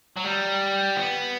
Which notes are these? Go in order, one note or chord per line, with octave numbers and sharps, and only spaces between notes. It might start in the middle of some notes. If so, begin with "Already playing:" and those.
F#3
G3
B3